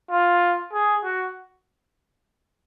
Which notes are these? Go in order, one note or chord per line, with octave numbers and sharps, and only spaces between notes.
F4
G#4
F#4